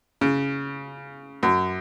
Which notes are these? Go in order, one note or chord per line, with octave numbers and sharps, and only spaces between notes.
C#3
F#2